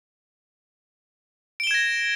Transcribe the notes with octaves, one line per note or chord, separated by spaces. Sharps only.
G#6 A#6 D7 E7 G7